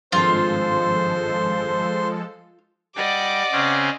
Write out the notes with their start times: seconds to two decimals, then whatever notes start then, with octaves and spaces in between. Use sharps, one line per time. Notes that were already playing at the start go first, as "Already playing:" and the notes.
0.12 G#1 G2 F3 G#3 F4 A4 C5 C6
2.96 G3 D5 D#5 F#5 D6
3.52 C#3 C4 C#4